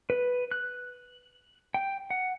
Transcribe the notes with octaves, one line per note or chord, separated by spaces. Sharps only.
B4
F#6
G5
F#5